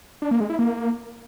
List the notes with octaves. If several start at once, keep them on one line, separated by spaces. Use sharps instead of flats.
D4
A#3
G#3
E4
A#3